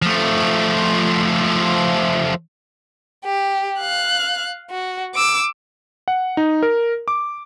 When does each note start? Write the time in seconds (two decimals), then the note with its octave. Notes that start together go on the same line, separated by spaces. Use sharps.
0.02 F3 A3
3.25 G4
3.80 F5 F#6
4.71 F#4
5.15 D6 E6
6.08 F#5
6.37 D#4
6.63 A#4
7.08 D6